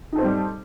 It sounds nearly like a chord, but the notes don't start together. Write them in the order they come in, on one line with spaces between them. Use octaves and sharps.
D#4 A4 C5 C4 G3